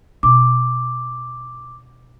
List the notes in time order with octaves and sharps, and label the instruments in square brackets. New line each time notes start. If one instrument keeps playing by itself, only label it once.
[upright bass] B2 D#4 [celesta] D6